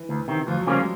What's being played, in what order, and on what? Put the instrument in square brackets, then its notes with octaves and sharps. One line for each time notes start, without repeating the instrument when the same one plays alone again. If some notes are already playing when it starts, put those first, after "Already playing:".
Already playing: [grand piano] E3
[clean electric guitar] D2
C3 D#3
[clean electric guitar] D2 [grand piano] F3
[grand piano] F#3
[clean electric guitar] C#3 F3 A#3 C#4 [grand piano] G3
[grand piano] G#3